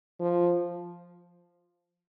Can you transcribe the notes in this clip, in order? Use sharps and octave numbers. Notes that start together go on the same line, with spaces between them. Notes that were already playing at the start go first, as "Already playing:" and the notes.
F3